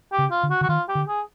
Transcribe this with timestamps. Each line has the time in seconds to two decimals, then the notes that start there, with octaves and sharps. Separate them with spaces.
0.12 G4
0.18 C#3
0.30 F4
0.43 D3
0.50 F#4
0.61 D3 F#4
0.69 D#3 F4
0.88 G4
0.95 D3
1.07 G#4